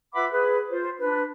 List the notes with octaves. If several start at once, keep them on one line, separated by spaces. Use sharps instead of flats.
F4 B4 E5 F#5 B5 D6
G#4 B4
F4 C5
D4 B4